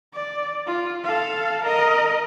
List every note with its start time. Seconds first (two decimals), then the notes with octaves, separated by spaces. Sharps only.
0.14 D5
0.66 F4
1.04 A4 F5
1.64 A#4 D#5